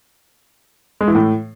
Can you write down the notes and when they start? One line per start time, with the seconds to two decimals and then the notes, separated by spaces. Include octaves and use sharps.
1.01 G#3
1.08 E3
1.15 A2